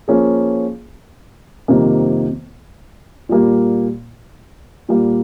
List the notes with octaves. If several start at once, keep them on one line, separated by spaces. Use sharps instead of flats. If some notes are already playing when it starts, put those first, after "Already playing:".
F3 A#3 C#4 F4 G#4
F2 C3 D#3 G3 A#3
A#2 G3 A#3
A#2 G3 A#3